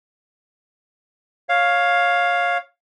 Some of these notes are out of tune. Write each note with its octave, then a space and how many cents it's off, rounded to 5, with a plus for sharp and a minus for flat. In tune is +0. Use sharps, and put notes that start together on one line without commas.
C#5 +0 F5 +10